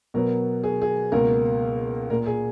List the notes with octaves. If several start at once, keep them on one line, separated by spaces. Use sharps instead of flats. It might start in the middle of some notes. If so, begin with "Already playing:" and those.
B2 F#3 B3 A#4
G#4
G#4
C#2 B2 A#3 A#4
A#2 A#3 A#4
G#4